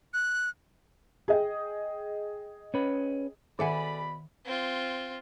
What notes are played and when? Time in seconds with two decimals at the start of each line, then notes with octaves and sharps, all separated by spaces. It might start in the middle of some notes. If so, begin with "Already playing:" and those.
0.14 F#6
1.28 G#4 D#5 G5
2.74 C#4 B4
3.59 B2 D#3 A4 D5 E5 F#5 G#5 B5
4.45 C4 F4